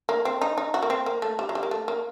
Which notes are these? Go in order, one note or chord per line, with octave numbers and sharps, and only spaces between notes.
A#3
C4
D#4
D#4
F#4
A#3
C4
A#3
A3
G3
F#3
G3
A#3
A3
A#3